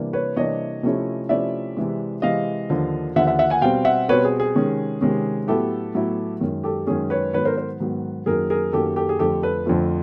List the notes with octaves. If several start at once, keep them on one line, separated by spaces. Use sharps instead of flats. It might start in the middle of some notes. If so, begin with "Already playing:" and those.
Already playing: C3 E3 G3 A#3 D4
B4 C#5
C3 E3 G3 A#3 D4 C#5 D#5
C3 F3 A3 C#4 E4
C3 F3 A3 C#4 E4 D5 E5
C3 E3 G#3
C3 E3 G#3 D#5 F5
D#2 D3 F3
D#2 D3 F3 E5 F#5
E5 F#5
E5 F#5
F#5 G#5
B2 G3 C4 F5 G5
E5 F#5
B2 G3 C4 B4 C#5
G#4
G#4
C3 D#3 G#3 C#4
C3 D#3 G#3 C#4
A2 F#3 B3 E4 G4 A4
A2 F#3 B3 E4
F#2 D#3 G#3 C#4
G4 A4
F#2 D#3 G#3 C#4 G#4
B4 C#5
G#2 D#3 F#3 B3 B4 C#5
A#4 C5
A#4 C5
G#2 D#3 F#3 B3
F#2 D#3 F#3 A#3 G#4 A#4
G#4 A#4
F#2 D#3 F#3 A#3 G4 A4
G4 A4
G#4
F2 D3 F3 A3 G4 A4
A4 B4
F2 D3 F3 A3